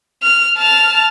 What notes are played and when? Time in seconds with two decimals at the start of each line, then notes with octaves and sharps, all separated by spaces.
0.22 F6
0.58 A5 F6